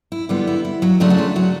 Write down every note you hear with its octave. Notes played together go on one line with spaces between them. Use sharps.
E4
D3 G3 B3 F4
E4
E4
F#3 F#4
C#3 F#3 A3 D4 F4
F#4
F4
F#3 F#4